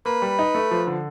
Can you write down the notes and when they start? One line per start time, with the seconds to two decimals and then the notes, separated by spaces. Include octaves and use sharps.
0.06 A#3 B4
0.22 G3
0.39 D#4
0.55 A3
0.71 F3
0.87 D3